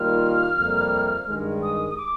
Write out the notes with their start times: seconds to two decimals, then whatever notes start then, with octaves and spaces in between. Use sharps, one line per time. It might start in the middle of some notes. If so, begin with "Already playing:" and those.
Already playing: D#3 G3 A#3 F4 F6
0.57 F2 C3 G3 A#3
1.27 G2 D#3 G#3
1.62 D#6
1.90 D#6
1.97 D6